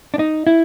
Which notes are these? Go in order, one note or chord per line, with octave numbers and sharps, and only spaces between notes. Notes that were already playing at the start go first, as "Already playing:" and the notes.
D4
D#4
E4